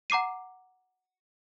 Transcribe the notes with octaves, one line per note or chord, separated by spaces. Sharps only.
F#5 A#5 D6 C7 D#7